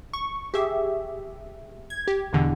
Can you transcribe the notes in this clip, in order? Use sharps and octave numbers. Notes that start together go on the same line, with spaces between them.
C#6
G4 G#4 E5
G#6
G4
E2 B2 D3 E3